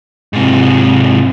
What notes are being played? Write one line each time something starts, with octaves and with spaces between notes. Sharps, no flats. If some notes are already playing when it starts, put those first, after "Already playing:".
G#2 C3